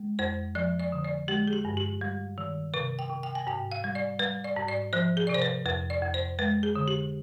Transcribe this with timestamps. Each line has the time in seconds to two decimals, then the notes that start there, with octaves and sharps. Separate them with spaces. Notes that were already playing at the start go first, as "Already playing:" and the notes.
Already playing: G#3
0.19 F2 C5
0.55 F3 D5
0.80 D5
0.92 D3
1.04 D5
1.28 G#3 G4
1.47 G#4
1.53 G4
1.65 G2
1.77 G4
2.01 G3
2.38 D#3
2.74 C3 B4
2.99 G5
3.10 C3
3.23 G5
3.35 G#5
3.47 G#2 G5
3.72 F5
3.84 G3
3.95 D5
4.19 G3 B4
4.44 D5
4.56 G#2
4.68 D5
4.93 F3 C5
5.17 G#4
5.27 C3 D5
5.34 C5
5.42 B4
5.66 F2 B4
5.90 D5
6.02 F2
6.14 C5
6.39 G#3 B4
6.63 G#4
6.75 D3
6.88 G4